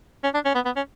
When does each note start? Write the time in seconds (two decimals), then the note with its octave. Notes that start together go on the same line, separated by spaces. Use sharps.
0.24 C#4
0.34 D4
0.45 C#4
0.55 B3
0.66 B3
0.76 C#4